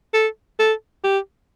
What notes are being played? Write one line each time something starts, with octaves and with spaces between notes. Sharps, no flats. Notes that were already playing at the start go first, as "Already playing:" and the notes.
A4
A4
G4